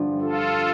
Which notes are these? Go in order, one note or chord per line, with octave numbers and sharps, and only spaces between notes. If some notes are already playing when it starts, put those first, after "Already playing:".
Already playing: G2 D3 F3
F4 A4